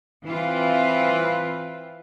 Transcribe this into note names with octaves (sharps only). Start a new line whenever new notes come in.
E3 C4 F4 B4